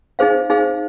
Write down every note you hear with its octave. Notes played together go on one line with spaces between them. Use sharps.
D#4 G#4 C5 F5
D#4 G#4 C5 F5